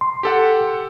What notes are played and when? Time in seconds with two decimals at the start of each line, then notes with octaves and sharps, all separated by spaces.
0.01 C6
0.23 G4 A4 F#5